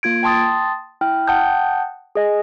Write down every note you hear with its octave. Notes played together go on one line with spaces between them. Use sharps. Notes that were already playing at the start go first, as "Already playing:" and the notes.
A#3 F4 G#6 D7
G5 A5 C6 D#6 A6
E4 G5 F6
F#5 G5 A5 D#6 G6
G#4 D#5 G#5